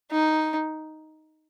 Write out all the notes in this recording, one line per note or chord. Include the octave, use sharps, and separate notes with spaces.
D#4